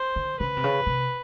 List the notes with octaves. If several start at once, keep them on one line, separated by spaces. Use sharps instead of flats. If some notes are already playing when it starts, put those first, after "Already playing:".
Already playing: C5
D3
C#3 B4
C3
C#3
C3